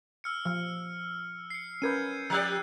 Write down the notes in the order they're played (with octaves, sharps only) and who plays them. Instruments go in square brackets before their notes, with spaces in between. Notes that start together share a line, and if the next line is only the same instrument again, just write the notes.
[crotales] E6 F6 C#7
[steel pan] F3 [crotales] E6 F6
[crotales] C7 C#7
[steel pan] C#4 A#4 B4 [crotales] G6 G#6 D#7
[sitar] F3 G4 D5 [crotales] E6 F#6